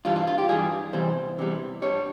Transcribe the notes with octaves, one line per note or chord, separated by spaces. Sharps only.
G2 E3 G3 F4
F4
F4
G4
G2 E3 G3 G#4
E2 C3 E3 G3 C5
E2 C3 E3 G3
G2 G3 C#5